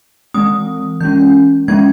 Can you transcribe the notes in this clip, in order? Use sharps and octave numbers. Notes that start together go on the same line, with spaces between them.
E3 G#3 C4 D#6
E3 G#3 C#4 G6
F3 G#3 C#4 G#6